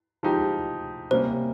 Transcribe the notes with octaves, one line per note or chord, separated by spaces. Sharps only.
F3 G#3 D#4 G4
C3 G3 A#3 C#4 C5